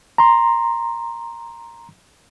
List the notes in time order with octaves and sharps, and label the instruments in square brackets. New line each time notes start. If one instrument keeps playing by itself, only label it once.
[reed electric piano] A#5 C6